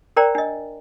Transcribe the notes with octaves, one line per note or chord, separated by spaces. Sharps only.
A#4 C5 D5 G5 A#5
D4 D#5